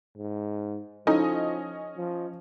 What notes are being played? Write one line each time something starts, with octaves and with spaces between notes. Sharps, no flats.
G#2
F3 C#4 D#4 E4 A4 D#5 G#5
F3